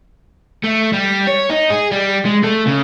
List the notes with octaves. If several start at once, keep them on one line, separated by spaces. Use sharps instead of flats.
A3
G3
C#5
D#4
G#4
G3
G#3
A3
C#3